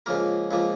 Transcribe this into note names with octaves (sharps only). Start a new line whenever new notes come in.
C#2 C#3 F3 A#3 A#4
C#2 C#3 F3 A#3